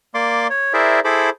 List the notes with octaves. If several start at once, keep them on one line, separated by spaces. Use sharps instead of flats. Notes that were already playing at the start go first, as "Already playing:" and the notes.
A#3 D5 C6 D6
C#5
E4 G#4 A#4 C5 D5 E5
E4 G#4 A4 C5 B5 D6